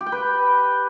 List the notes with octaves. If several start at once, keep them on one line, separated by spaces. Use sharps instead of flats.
G4
G5
B4